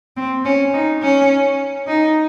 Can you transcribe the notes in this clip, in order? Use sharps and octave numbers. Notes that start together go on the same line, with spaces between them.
C4
C#4
D#4
C#4
D#4